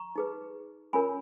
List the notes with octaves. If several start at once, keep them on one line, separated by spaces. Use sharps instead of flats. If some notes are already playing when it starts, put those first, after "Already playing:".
Already playing: A#5 C#6
D#4 G#4 B4
C#4 F4 A#4 C#5 G#5 B5